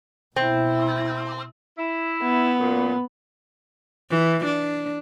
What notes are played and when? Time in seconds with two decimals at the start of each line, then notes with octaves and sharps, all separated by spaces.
0.36 B2 C4 E4
1.78 E4
2.22 B3
2.60 F#2 A#2
4.11 E3
4.45 D4